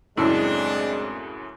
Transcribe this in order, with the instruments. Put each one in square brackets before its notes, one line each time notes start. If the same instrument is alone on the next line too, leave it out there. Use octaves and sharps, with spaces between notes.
[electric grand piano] F#2 A2 C#3 [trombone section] G#3 C4 [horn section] D4 [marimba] E4 A5